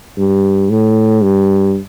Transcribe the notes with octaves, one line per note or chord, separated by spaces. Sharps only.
G2
A2
G2